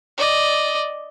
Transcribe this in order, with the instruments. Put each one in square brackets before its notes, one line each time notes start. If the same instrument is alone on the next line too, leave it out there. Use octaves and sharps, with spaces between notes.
[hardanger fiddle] D5 D#5